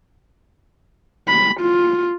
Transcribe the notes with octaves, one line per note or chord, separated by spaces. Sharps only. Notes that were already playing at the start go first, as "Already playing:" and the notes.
B5
F4